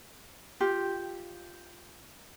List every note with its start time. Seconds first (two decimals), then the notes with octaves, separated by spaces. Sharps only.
0.61 F4 G4